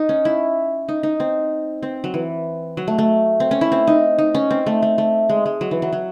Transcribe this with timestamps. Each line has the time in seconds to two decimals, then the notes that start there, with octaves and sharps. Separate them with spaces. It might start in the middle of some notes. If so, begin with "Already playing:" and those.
Already playing: D#4
0.09 C#4
0.25 E4
0.89 D#4
1.03 D#4
1.20 C4
1.83 C4
2.04 F#3
2.14 E3
2.77 F#3
2.88 A3
2.99 A3
3.40 C4
3.51 C#4
3.61 E4
3.72 C4
3.87 D#4
4.19 D#4
4.35 C#4
4.51 C4
4.66 A3
4.82 A3
4.98 A3
5.29 G#3
5.46 G#3
5.61 F#3
5.71 E3
5.82 F#3
5.93 F#3